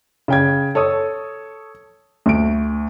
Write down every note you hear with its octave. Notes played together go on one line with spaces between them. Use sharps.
C#3 G5 G#6
A4 C#5 D#6
D2 D7